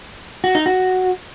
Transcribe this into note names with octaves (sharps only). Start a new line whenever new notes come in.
F#4
D#4
F#4